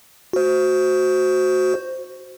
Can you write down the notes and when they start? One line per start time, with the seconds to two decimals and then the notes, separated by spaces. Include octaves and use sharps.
0.33 F#4 C5